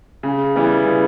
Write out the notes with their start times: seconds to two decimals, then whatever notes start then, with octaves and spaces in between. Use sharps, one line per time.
0.23 C#3
0.56 E3 G3 B3
0.86 C#3